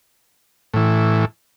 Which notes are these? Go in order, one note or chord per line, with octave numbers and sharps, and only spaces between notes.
A2 E3